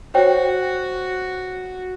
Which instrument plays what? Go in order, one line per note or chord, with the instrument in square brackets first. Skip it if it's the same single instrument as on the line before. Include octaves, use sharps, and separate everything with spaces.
[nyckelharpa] F#4 [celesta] C5 C#5 G5